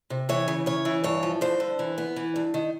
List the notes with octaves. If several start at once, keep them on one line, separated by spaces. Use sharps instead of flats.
C3
E3 C#5
C#3
C#3 C#5
E3
G2 C#5
F3
G2 C5
D3
E3
B3
E3
G2
D#3